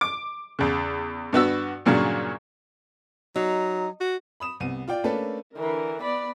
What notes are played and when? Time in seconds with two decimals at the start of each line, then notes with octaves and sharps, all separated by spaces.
0.01 D6
0.59 E2 C#3
1.33 G2 B3 F#4 E6
1.86 G2 A#2 C#3 F#3
3.36 F#3 D#4
4.00 F#4
4.40 B5 D#6 E7
4.60 C2 B3 D#7
4.88 F4 D5 G5
5.04 A3 A#3 C#4 D4 A4 B4
5.58 D3 E3 A#4
6.03 B3 D5 B5